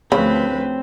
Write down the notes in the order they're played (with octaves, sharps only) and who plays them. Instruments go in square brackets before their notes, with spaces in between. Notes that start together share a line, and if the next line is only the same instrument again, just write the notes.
[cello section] D2 F3 B4 [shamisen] C#3 B5 [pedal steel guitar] C4